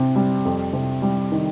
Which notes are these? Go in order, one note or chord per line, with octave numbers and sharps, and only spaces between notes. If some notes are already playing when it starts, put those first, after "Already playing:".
Already playing: C3 C4
G3
F2
C3
G3
D#3